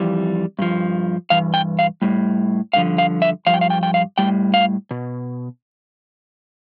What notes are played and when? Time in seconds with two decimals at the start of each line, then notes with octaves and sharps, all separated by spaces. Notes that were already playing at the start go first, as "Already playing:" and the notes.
Already playing: F2 E3 G3
0.59 G2 F3
1.30 G2 E3 F5
1.54 G5
1.79 F5
2.02 A2 G3
2.73 G2 D3 F3 F5
2.98 F5
3.22 E5
3.47 G2 F3 F5
3.54 G5
3.61 F5
3.70 G5
3.83 G5
3.94 F5
4.18 A2 G3 G5
4.54 F5
4.91 B2